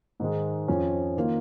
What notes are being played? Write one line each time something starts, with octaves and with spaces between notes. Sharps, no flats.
G#2 D#3 G#3
F2 F3 C#4
D#3 A#3 F4